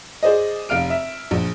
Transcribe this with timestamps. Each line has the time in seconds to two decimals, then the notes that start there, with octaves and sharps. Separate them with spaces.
0.23 G#4 C5 D5 D#5
0.69 F1 F5 F6 D7
0.90 E5
1.31 A#1